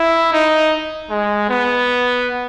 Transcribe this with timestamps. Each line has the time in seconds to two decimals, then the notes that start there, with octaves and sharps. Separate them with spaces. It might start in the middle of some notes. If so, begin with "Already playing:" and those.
Already playing: E4
0.33 D#4
1.10 G#3
1.50 B3